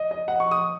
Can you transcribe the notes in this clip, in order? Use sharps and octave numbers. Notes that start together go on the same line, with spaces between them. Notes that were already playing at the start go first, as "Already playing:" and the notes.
Already playing: D#5
D#5
F#5
C#6
D#6